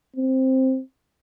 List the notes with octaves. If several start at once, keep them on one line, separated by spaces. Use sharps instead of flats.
C4